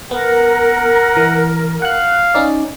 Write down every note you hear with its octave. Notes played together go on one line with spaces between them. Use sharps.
B3 A#4 F#5
E3
F5 F#5 F#6
C#4 D#4 D5